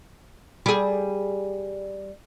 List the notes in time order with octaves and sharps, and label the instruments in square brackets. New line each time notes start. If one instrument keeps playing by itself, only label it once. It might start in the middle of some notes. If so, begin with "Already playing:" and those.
[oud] G3 G#4